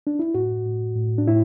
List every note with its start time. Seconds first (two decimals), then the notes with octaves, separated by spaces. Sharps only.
0.07 D4
0.19 E4
0.35 A2 F#4
0.66 A2
0.96 A2
1.18 D4
1.27 A2 E4